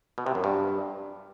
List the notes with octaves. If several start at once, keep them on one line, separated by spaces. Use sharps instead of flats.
B2
C3
F#2
G2